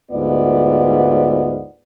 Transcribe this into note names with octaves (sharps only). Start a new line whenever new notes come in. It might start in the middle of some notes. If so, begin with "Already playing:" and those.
D2 G#2 B3 F4 D5